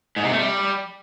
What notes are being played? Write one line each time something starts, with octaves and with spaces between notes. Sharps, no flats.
G#2
C3
A3
G3